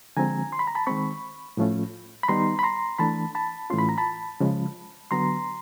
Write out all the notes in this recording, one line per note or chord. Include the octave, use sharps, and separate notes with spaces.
D3 F3 G#3 C4 G#5 A#5
C6
B5
A#5
A5 B5
D#3 G#3 C4 B5 C#6
A2 F3 A3 C#4 F4
B5
D#3 G3 B3 D#4 A#5 C6
B5
A#5 C6
E3 A3 D4 A5 B5
A5 B5
A2 E3 A3 C#4 F4 C6
B5
A#5
A5 B5
C#3 F3 G#3
D3 F#3 B3 A#5 C6